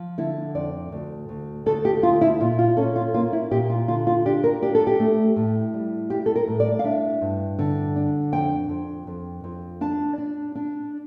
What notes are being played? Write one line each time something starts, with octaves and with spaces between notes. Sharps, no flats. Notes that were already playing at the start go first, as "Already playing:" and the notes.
Already playing: F3
D3 E4
F2 D5
D2
D2
D2 A4
G4
D2 F4
E4
A#2 F4
F4
C#4 A4
F4
A#3 F4
E4
A#2 G4
F4
D3 F4
F4
D4 G4
A#4
D4 G4
A4
G4
A3
A2
G3
G3 G4
A4
A#4
A2
D5
F5
D4 E5
G2
D3
D4
F2 G5
F2
F2
F2
D4 A5
D4
D4